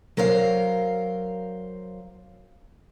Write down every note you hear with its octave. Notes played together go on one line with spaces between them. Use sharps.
F#3 A#4 C5 F5